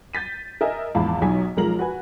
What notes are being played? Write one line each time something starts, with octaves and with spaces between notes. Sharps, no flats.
G6 A6 B6 D#7
A#4 D#5 E5 G#5
A#1 E2 G#2 F5 A5 B5
B1 F#3 D#4 G#5 B6
B1 F3 G#3 A#4 A#5 F#7
F#4 B4 G#5